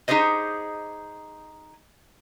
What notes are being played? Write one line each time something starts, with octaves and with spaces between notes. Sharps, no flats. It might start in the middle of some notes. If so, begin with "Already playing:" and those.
D#4 G4 G#4 C5 D#5